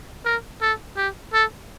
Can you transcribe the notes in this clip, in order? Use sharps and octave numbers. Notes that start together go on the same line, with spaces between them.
A#4
A4
G4
A4